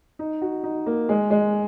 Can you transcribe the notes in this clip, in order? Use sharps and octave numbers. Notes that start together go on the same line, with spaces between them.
D#4
F#4
D#4
A#3
G#3
G#3